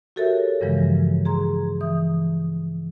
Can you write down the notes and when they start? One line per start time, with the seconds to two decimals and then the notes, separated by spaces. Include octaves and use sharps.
0.16 F#4 G4 A4 A#4 C#5 E5
0.61 G2 C#3 E3 F3 G#3
1.25 G#4 A#5 C6 G#6
1.81 E3 D#6